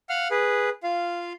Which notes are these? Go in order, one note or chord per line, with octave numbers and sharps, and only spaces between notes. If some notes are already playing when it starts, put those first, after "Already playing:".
F5 F#5 F6
G#4 B4
F4 F5